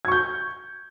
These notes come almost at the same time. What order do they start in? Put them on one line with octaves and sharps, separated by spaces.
G#6 C#6 G6